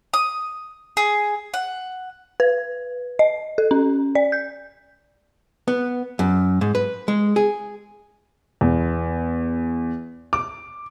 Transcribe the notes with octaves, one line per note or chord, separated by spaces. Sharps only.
D#6
G#4
F#5
B4
D#5
A4
C#4
D5
G6
B3
F#2
G#2
B4
G#3
G#4
E2
D6